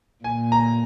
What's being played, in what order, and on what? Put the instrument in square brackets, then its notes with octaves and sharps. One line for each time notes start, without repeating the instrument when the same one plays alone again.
[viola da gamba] A#2 [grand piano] G#5
[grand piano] A#5